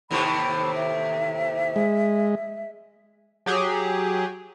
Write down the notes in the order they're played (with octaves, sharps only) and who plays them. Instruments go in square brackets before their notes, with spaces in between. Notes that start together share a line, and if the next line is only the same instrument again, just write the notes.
[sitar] D#2 A2 C3 [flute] B5
[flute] E5
[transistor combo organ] G#3
[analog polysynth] F#3 G4 G#4